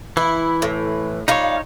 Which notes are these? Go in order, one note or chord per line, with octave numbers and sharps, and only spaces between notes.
E3 E4
A2
G3 D#4 F4 C#5